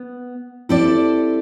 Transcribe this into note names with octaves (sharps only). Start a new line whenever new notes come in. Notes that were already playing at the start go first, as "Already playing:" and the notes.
Already playing: B3
G3 C4 E4 A4 D5